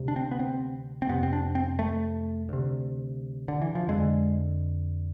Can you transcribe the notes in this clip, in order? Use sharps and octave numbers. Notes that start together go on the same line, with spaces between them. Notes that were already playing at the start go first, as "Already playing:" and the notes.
Already playing: D2 C3
D4
C4
B3
C4
C4
F2 C3 B3
C4
D4
C4
A3
D2 C3
D3
E3
F3
F2 D3 G#3